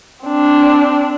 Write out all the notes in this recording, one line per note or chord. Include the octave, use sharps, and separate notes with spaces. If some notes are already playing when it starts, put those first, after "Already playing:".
C4 D4